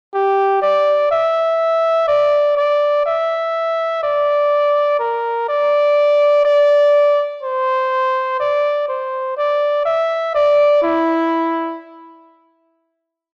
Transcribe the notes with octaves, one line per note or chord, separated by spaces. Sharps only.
G4
D5
E5
D5
D5
E5
D5
A#4
D5
D5
C5
D5
C5
D5
E5
D5
E4